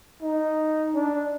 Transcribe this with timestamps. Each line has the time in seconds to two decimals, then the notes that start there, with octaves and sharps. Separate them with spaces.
0.22 D#4
0.94 D4